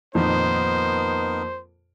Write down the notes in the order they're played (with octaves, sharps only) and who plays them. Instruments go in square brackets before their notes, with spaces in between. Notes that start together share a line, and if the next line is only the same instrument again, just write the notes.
[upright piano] F2 A#2 D#3 [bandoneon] B3 D#4 A#4 [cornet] C5